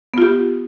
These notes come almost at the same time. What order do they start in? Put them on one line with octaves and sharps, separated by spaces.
B3 F4 G4